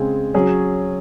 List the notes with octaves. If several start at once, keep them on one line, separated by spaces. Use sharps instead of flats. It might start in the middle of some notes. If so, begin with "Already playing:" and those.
Already playing: C#3 G#3 C4
F#3 C#4 G#4